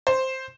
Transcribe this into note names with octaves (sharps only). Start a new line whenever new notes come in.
C5